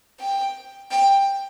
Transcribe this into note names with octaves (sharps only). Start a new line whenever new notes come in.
G5
G5